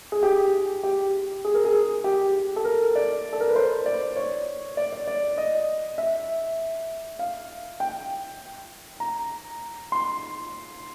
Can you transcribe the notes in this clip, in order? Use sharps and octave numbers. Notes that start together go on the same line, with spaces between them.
G#4
G4
G4
G#4
A#4
G#4
G4
A4
A#4
D5
A4
A#4
B4
C5
D5
C#5
D5
D5
D5
D#5
E5
F5
G5
A#5
C6